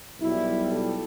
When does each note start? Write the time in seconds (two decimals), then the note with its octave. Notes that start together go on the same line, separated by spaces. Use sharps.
0.20 B1 B2 G3 E4
0.70 A4